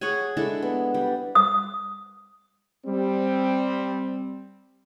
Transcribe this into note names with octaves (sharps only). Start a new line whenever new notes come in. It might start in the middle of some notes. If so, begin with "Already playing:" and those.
G#4 C#5 F#5 G#5
G#3 D4 E4 A4
B3
G3
D#6
G3 C4